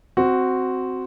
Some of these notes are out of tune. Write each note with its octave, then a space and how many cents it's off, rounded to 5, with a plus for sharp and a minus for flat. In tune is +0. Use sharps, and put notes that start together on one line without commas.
C4 -5 F#4 +0